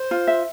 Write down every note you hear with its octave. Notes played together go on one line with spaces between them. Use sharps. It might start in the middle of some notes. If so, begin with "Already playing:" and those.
Already playing: C5
F4
E5